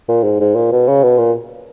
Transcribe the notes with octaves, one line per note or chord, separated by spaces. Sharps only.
A#2
G#2
G#2
A#2
B2
C#3
B2
A#2